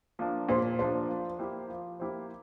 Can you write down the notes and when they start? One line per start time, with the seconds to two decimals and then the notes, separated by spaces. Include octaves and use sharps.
0.19 F3 A#3 D4 F4
0.49 A#2 C5
0.79 F3 A#3 D4 F4 C5
1.09 F3
1.39 A#3 E4 G4 C5
1.70 F3
2.00 A#3 E4 G4 C5